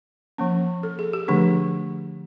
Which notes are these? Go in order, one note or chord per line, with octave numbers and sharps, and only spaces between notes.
F3 A#3 C#4
A4
G#4
G4
D3 F3 A3 D4 G#4